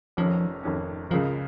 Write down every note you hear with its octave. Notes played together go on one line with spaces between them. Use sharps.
F1 F2 D#3 F3 C#4
F1 F2 D#3 C#4
C#2 C#3 F3 G#3 F4 A#4